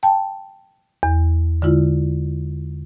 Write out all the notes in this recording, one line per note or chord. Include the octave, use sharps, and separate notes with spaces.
G5 A5
E2
D3 G#3 E4 F4